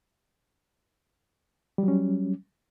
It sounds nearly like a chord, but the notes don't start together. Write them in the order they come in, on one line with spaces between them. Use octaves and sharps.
G3 F#3 C#4